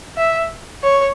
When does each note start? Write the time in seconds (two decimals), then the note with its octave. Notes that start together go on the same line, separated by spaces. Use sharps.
0.17 E5
0.83 C#5